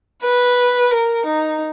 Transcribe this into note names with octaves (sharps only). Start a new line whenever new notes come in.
B4
A#4
D#4